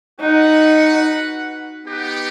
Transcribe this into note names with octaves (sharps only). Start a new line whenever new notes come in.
D#4 F#4 B4 F#5
B3 D#4 G4 B4 F#5